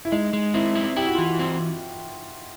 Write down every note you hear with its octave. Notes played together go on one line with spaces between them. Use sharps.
E4
G#3 D#4
G#3
C4 E4
E4
E4 G4
F#4
E3 F4
F#4
C4